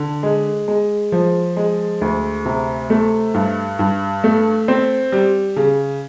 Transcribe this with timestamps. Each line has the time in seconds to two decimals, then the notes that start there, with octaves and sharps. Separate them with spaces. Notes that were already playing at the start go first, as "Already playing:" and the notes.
Already playing: D3
0.23 G#3
0.68 G#3
1.12 F3
1.56 G#3
2.01 D2
2.45 C3
2.90 A3
3.34 G2
3.79 G2
4.24 A3
4.68 C4
5.12 G3
5.56 C#3